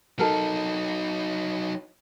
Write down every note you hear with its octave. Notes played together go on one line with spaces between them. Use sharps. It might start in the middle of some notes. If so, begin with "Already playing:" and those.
F#3 D#4 A4 A#4